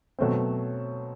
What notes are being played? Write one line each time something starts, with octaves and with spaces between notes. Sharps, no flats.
B2 F#3 A3 C4